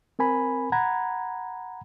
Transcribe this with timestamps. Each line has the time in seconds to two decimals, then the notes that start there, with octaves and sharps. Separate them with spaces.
0.19 C4 A#4 G#5 B5
0.72 F#5 A#5 B5 G#6